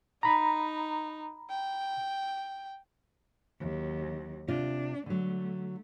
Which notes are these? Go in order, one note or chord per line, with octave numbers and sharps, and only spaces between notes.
D#4 A#5 B5
G5
D#2 F#3
C3 D4 F4
D3 F#3 A3